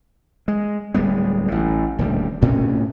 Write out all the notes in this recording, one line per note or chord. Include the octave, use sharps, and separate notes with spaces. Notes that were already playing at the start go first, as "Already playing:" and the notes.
G#3
D1 G3 G#3 B3
A1 A2
D#1 D2 G3
D2 A2 C3 C#4